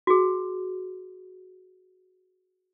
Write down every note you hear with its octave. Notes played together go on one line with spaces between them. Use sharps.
F#4 G#4